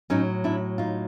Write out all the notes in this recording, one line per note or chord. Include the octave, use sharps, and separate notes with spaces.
A2 F#3 C#4 D#4
D4 E4
D#4 F4